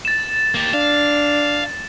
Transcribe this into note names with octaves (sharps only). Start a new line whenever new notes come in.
A6 E7
A#3 G4 A6
D4 F5